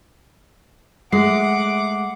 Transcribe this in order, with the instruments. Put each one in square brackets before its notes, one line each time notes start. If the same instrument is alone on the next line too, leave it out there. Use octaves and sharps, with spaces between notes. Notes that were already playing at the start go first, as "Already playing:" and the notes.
[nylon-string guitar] G#3 [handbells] A3 C7 [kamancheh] F#5 D6